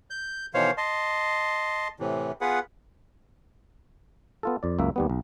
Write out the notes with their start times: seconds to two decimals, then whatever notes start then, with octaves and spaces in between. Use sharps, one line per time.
0.10 G6
0.54 B2 D#3 E3 C5 C#5 F5
0.77 D#5 A5 C6
1.99 A2 C3 E3
2.41 B3 F4 G#4 B4 F#5
4.43 B3 F4 A4
4.63 F2 D5
4.79 C#2 F#2 A#3 E5
4.96 D#2 G3 B3
5.10 B1